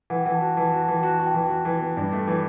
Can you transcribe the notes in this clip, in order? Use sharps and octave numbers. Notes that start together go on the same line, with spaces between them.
E3 F#5
G5
E3 F#5
A5
F#4
E3 A5
F#4
A5
E3
G5
F#4 A5
F#4
G5
E3
F#4
E3
B3
G2
A3
E3